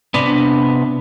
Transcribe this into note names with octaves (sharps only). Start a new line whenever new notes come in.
C3 B3 D4